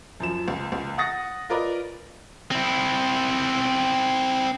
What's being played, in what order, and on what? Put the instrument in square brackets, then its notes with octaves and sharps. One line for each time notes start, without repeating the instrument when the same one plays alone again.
[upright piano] F#2 F3 E7
C#2
C#2
F#5 D#6 A6 A#6
F4 A#4 B4 D5 D#5
[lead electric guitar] C4 E4